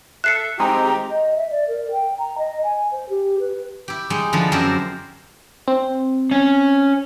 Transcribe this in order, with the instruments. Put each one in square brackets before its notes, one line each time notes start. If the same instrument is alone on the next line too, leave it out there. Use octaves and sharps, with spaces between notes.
[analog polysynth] A4 E5 [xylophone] F#6 C7 C#7
[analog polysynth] G#3 C4 D#4 [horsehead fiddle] G4 [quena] A#5
[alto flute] D#5
E5
D5
A#4
G5
A#5
D#5
G#5
C5
G4
B4
[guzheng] E4 G4
G3 G#3 D#4
D3 F3 B3 E4
F#2 C4 G4 A#4 C5 E5
[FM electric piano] C4
[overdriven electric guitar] C#4